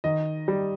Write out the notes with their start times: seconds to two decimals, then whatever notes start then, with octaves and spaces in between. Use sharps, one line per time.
0.04 D#3 D#5
0.48 G3